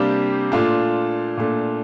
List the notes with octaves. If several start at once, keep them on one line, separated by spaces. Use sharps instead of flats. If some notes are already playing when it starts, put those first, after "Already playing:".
Already playing: C3 G3 A#3 D4 G4
A#2 A3 D4 F4
A#2 A3 D4